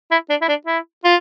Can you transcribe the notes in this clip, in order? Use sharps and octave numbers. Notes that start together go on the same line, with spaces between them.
E4
D4
E4
D4
E4
F4